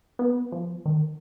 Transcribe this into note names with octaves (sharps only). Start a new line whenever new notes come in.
B3
F3
D#3